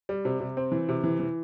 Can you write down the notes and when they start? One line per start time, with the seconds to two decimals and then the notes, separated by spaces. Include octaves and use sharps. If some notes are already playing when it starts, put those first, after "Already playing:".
0.09 G3
0.25 C3
0.40 C3
0.57 C4
0.72 E3
0.89 C3
1.04 E3
1.20 E3